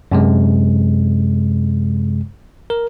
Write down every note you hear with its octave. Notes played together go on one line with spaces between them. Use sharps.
F#2 C3 G#3
A#4